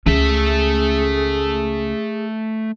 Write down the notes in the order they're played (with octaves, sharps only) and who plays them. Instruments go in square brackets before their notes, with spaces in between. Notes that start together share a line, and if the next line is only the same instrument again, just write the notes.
[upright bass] C#2 C#4 [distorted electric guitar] A3 E5 [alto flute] G#4